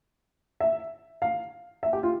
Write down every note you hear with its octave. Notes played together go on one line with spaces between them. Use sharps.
E5
F5
E5
G4
F4